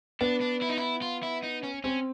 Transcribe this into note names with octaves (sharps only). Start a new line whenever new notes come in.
B3 D4
D4
E4
D#4
E4
F4
E4
D#4
C#4
C4 C#4